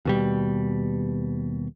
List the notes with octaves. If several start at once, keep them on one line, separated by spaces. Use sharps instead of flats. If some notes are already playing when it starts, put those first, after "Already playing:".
D#2 B2 G3